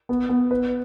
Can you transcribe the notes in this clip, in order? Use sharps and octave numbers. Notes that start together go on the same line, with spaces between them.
B3
B3
B4